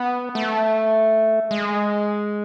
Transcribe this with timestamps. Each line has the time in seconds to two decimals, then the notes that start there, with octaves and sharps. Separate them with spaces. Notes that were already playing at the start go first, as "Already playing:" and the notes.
Already playing: B3
0.35 A3
1.51 G#3